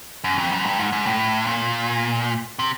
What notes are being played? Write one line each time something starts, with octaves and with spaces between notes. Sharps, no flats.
F#2
F2
F#2
G2
G#2
G#2
A2
A#2
C3